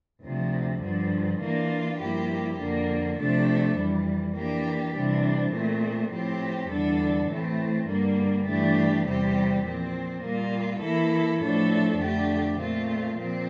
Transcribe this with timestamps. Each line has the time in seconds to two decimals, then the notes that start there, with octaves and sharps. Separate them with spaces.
0.22 D2 C3 F3
0.81 G2 D3 F3
1.40 E3 A#3 D4 F4
1.99 G2 F3 A#3 E4 G4
2.58 F2 D3 F3 A#3
3.16 C3 F3 A3 D4 A4
3.75 F2 E3 G3
4.33 E3 A#3 D4 G4
4.92 C3 E3 G3 D4
5.51 A#2 A3 C4
6.10 A2 F3 C4 G4
6.69 E2 D3 G3 D4 A4
7.27 A2 E3 A3 C4
7.86 G2 D3 G3 A#3
8.45 G2 E3 A3 D4 G4
9.04 E2 C3 G3 C4 G4
9.63 A#2 F3 C4
10.21 A#2 G3 A#3 F4
10.80 E3 A#3 E4 A4
11.39 A2 F3 A3 D4 A4
11.97 F2 D3 A3 D4 G4
12.56 A#2 A3 C4 F4
13.15 A#2 F3 C4